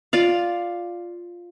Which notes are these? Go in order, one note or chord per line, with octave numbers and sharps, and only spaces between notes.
F4 D5 F5